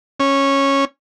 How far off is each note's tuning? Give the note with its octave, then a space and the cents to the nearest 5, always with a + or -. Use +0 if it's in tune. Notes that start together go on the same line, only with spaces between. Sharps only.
C#4 -10